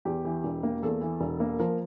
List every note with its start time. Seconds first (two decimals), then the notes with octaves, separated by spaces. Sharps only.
0.05 E2 G4
0.25 E3
0.44 E1
0.63 A#3
0.82 E2 A4
1.01 E3
1.21 E1
1.40 A#3
1.59 F3 A#4